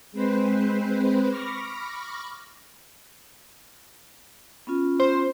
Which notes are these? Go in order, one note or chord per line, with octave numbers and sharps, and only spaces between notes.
G#3 C4 B4 C5
B5 C#6 D6 F6 A#6
B3 C#4 F4
C5